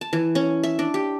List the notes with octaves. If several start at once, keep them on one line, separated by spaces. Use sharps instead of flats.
A5
E3
C#4
E5
D4
G4